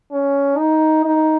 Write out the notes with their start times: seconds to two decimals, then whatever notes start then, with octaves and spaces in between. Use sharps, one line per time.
0.12 C#4
0.58 D#4
1.05 D#4